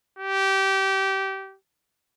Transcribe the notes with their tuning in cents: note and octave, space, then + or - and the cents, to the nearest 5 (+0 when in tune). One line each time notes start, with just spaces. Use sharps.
G4 -20